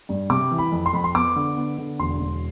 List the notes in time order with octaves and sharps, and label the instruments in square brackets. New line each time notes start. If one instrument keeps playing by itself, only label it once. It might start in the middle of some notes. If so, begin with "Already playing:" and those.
[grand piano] G2
C3 D6
E3
B5
F2
C6
F2 B5
C6
B3 D6
D3
B3
D3
E1 C6
E1